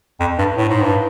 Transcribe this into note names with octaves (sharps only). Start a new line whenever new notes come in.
F2
G2
A2
G#2
G2